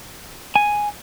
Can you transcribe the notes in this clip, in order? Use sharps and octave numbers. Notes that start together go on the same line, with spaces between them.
G#5